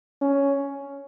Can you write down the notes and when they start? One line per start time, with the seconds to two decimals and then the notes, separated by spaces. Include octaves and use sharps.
0.21 C#4